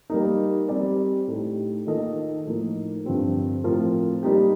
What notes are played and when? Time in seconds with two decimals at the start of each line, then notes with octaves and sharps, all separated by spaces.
0.10 G3 A#3 D#4
0.69 G3 C4 G4 D5
1.28 A2 A3 D#4 G4
1.87 D#3 A#3 F4 A4 D#5
2.46 A2 F3 A#3 D#4
3.05 G2 D3 F3 C4 G4
3.64 A2 F3 C4 F4 A#4
4.23 G3 A#3 D#4 G4